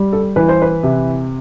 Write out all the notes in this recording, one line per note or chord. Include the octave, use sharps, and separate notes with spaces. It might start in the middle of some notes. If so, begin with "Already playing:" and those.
Already playing: G3
A4
E3 B4
C5
B4
C3